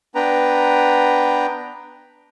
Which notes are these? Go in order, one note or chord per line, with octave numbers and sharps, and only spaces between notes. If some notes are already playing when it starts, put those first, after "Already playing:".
B3 D4 B4 G5 A#5